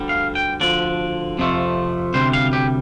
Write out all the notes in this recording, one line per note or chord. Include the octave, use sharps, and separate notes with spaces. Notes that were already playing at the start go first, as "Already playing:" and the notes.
Already playing: D2 D3 G3
F5
G5
D2 D3 F3 D5
F2 C3 F3 A3
D2 C3 G3 C5
F5
G4